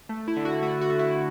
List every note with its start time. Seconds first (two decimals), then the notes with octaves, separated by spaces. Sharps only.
0.09 A3
0.28 E4
0.37 D3
0.45 F#4
0.63 A3 F#4
0.81 F#4
0.90 A3
0.99 E4